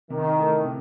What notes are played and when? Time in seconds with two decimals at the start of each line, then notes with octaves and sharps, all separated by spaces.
0.10 C3 D#3
0.37 E3 A3
0.65 C3